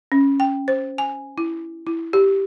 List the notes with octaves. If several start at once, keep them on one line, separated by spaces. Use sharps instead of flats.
C#4
G5
C5
G#5
E4
E4
G4